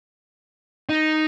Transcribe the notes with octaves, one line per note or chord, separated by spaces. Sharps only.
D#4